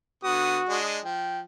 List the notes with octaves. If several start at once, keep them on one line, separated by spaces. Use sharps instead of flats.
D3 B3 F#4 D#6
G#3 D4 D#5
F3 G5